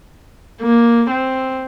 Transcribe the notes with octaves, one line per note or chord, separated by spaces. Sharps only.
A#3
C4